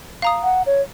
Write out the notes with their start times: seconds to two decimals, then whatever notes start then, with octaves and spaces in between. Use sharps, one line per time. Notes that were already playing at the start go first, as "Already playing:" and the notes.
0.22 F5 A#5 D#6
0.43 F#5
0.66 C#5